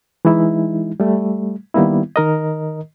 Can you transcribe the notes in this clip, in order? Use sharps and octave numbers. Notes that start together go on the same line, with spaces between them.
E3 G#3 D#4 E4
G3 A3
D#3 G3 A#3 B3 E4
D#3 A#4 D#5